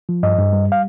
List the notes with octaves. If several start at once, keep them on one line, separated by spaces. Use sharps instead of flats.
F3
G2 D#5
G2
G3
F5